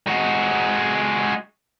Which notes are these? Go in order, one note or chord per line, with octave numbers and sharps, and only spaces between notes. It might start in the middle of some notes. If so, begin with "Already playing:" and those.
G#3 F#4